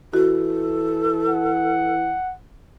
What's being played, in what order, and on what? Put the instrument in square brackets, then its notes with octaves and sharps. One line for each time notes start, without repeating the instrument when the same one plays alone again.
[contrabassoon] E3 [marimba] F#4 [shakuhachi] A4
[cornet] F#5